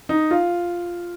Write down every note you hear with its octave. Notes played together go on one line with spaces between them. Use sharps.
D#4
F4